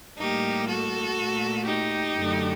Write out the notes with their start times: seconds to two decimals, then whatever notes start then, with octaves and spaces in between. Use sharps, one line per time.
0.19 A2 G3 A#3 D#4 G4
0.68 F#4 A4
1.17 A#2 A3
1.65 D#4 G4
2.14 F#2 D3 A3